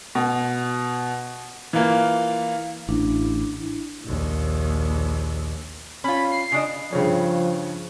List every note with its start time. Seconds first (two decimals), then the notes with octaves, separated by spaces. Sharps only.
0.15 B2
1.73 E3 A#3 F4
2.89 A1 D4 E4
4.04 A#1 D#2
6.04 C#4 F4 B5
6.32 C7
6.52 C#3 D4 D#5
6.93 G2 C#3 F3 C#4